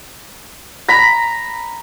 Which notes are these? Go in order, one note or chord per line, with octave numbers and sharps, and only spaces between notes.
A#5 B5